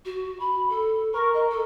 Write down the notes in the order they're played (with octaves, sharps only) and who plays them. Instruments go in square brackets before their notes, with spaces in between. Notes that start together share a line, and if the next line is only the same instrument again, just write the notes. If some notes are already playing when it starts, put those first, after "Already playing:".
[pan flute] F#4
B5
A4
[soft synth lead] A#4 [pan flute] C#6
[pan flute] D#5
A4